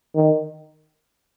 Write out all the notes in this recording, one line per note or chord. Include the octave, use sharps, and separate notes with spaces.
D#3